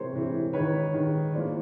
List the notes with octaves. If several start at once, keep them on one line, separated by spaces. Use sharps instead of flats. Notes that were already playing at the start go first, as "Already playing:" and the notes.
Already playing: C3 E3 G#3 A#4 C5 C#5
C3 E3 G#3
D#3 G#3 B4 C#5
D#3 G#3
A2 F3 A#3 C5 D5